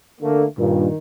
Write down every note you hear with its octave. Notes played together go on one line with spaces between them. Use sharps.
D3 A3 A#3
G2 A#2 D#3